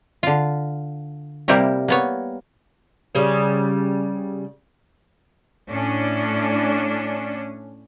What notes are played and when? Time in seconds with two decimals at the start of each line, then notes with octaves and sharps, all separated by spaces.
0.23 D3 F4
1.48 C3 G3 A#3 E4 G4 A#4
1.88 A#3 B3 C#5
3.15 C#3 G3 C#4
5.70 A2 C#4 D4